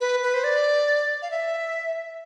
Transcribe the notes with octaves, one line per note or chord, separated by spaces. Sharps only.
B4
B4
C5
D5
F5
E5